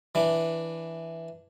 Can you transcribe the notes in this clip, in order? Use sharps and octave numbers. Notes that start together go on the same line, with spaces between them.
E3 D4